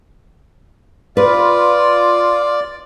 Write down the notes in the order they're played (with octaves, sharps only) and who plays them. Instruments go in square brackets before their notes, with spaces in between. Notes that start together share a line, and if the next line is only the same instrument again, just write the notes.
[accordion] F4 [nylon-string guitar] B4 [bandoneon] D5